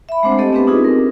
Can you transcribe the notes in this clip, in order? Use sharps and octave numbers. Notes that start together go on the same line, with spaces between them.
E5 B5
G#3 A3 C4 D4 C5 F#5
A3 C4 G4 A4 D#5
B3 C4 G4 B4
C4 D4 D#4 F4 G#4
A#4